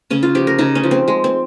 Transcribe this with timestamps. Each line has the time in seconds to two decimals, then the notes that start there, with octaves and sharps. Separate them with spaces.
0.10 C#3 C#4
0.23 F4
0.35 F3 G4
0.47 A#4
0.59 C#3 D#4
0.75 C#4
0.84 F3
0.91 C4
1.08 G#3
1.24 C4